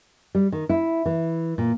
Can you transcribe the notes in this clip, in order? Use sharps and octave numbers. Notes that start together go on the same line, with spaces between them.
G3
D#3
E4
E3
A#2